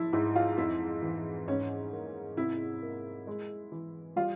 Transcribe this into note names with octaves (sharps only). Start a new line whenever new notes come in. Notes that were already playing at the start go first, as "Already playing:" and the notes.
Already playing: F3 E4
G#2 E4
F4
F2 E4
E3
G#2 C#4
A#3
C3 E4
A#3
G#3
E3
G3 F4